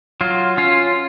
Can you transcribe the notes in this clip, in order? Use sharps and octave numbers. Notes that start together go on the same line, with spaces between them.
F#3 F4
C#4 F4